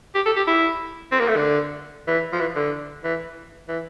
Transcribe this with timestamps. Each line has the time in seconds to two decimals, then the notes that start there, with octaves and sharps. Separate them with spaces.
0.15 G4
0.26 A4
0.36 G4
0.47 E4
1.12 C4
1.20 A#3
1.28 A3
1.36 D3
2.08 E3
2.32 F3
2.40 E3
2.56 D3
3.04 E3
3.68 E3